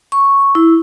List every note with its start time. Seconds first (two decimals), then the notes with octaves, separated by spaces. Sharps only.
0.12 C#6
0.55 E4